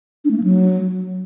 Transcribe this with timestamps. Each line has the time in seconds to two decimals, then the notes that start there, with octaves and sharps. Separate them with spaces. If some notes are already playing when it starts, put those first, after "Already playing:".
0.25 D4
0.31 A3
0.37 A#3
0.43 F#3